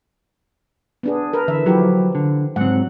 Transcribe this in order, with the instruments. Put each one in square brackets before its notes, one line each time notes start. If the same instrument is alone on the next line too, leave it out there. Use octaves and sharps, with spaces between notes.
[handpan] B3 D4 G#4
A#4 B4
D3 E3 E5
[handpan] F3 E4 G4 [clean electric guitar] F#3
[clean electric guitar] D3
[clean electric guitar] G#2 C4 [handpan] C#3 F#3 F#5